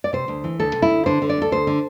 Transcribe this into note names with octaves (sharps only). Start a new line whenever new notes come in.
D5
C3 C5
D2
E3
D2 A4
C3
E4
D2
D3 C5
D3
D5
D2 A4
D2 C5
D3